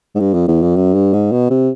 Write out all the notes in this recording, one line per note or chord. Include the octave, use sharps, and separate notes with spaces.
G#2
G2
F2
E2
F2
F#2
G2
G#2
B2
C3